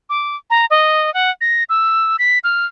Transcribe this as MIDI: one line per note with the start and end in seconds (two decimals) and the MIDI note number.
0.09 0.36 86
0.50 0.65 82
0.70 1.12 75
1.14 1.30 78
1.41 1.63 94
1.69 2.16 88
2.19 2.39 95
2.44 2.66 89